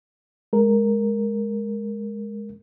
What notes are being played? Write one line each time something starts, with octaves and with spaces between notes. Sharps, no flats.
G#3 A#4